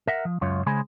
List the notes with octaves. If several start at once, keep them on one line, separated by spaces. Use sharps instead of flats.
A#4 E5 F#5
F3
C#2 F#2 F4 C#5
C#3 G#3 C5 G#5 B5